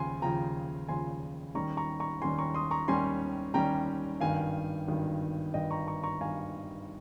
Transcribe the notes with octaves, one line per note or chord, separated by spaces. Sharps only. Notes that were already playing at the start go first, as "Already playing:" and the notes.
Already playing: D#2 C#3 F3 G#5 C6
D#2 C#3 F3 G5 A#5
D#2 C#3 F3 G#5 C6
D#2 D#3 G3 C#4 A#5 C#6
A#5 C#6
A#5 C#6
D#2 D#3 G3 C#4 G#5 C6
A#5 C#6
C6 D#6
A#5 C#6
D#2 D#3 G3 C#4 G#5 C6
D#2 D#3 G3 C#4 G5 A#5
G#1 G2 D#3 F5 G#5
G#1 G2 D#3
G#1 G2 D#3 D#5 G5
A#5 C#6
A#5 C#6
A#5 C#6
G#1 G2 D#3 F5 G#5